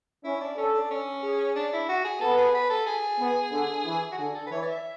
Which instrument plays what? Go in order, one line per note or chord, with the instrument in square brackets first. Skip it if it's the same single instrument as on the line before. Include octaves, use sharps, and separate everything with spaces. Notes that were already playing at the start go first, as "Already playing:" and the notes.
[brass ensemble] C#4 [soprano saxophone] E4
[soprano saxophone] D4
[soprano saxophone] C#4 [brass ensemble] A4
[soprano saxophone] D4
C#4
[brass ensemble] G#4
[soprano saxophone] D4
E4
F#4
G#4
[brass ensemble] B3 [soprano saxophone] A4
[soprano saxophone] G#4
B4
A4
G#4
[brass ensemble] B3
D3
E3
[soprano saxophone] F#4
[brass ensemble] D3 [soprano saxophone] G#4
[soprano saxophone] A4
B4
[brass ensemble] E3 [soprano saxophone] C#5
[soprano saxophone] D5
E5